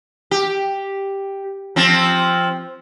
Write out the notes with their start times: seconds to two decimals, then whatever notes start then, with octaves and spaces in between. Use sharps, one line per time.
0.31 G4
1.76 F3 C4